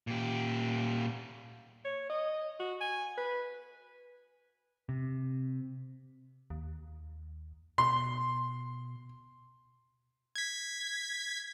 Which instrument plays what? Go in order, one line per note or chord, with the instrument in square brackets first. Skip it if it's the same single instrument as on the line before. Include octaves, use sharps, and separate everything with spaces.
[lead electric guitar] A#2 G4
[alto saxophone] C#5
D#5
F#4
G#5
B4
[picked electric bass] C3
[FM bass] D#2
[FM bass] B2 [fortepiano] C6
[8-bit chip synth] G#6 B6